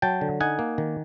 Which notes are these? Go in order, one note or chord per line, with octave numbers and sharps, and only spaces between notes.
F#3 G5 A5
D3
D#4 F#5 G#5
A#3
D#3